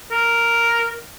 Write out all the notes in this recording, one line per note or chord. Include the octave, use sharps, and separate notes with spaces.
A#4